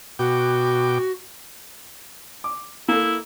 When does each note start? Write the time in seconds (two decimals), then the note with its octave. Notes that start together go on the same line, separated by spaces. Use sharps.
0.19 B2 F#4 G5 D6
2.44 D6
2.88 A#3 E4 A4